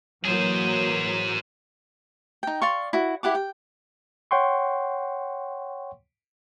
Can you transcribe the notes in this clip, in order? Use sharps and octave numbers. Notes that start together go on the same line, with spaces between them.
E3 F#3 A#3 G#4 C5
D#4 G5
D5 F5 C6 C#6
E4 F#4
E4 G4 F#5 D6
G5
C#5 F#5 G5 C6 C#6